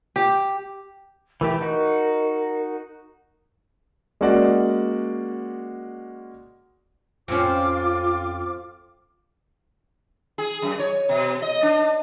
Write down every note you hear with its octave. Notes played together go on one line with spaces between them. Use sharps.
G4
E3 A3 G4 A#4
D#4 F#4
G#3 A#3 C#4 F#4 D5
F2 C4 C#4 F4 D6
G#4
F#2
C#5
B2
D#5
D4